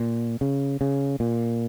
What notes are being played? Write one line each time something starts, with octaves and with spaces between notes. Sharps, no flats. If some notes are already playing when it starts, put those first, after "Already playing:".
Already playing: A#2
C#3
C#3
A#2